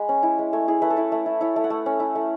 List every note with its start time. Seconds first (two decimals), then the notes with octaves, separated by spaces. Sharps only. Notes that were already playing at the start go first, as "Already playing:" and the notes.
Already playing: G#3 B5
0.09 C#4
0.23 E4
0.39 G#3
0.53 A3 C#5
0.68 E4 G#4
0.82 A3 B4
0.90 A4
0.97 E4 B4
1.12 A3
1.26 E4
1.41 E4 C#5
1.56 A3
1.64 F#5
1.70 A3
1.86 C#4
2.00 E4
2.15 A3